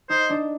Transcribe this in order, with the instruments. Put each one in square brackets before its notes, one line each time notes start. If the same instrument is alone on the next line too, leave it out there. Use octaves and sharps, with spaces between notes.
[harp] D#4 [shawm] C5
[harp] D4